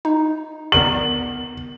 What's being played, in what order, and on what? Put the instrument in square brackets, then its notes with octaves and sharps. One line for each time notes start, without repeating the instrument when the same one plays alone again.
[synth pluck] D#4
[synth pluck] B3 A#4 D5 [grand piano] F#7